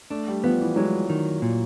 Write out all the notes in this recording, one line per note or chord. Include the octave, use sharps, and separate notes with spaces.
A3 D4
G3
F3 B3
E3
F#3 G#3
D#3
A#2